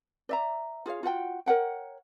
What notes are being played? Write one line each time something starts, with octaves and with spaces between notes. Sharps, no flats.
D5 E5 A#5
F4 G#4 C#5 F5
F4 F#4 F#5 G5
A#4 C#5 F#5 G5